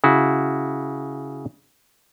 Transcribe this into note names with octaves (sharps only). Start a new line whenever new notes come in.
C#3 E4 F#4